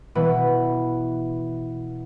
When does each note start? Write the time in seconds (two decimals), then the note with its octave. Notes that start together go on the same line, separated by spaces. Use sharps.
0.15 B2 E3 B3 E4